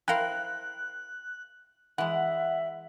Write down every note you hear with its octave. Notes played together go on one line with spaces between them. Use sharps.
E4 A#4 C5 F5 G5 F#6
E3 G#3 E5 F#5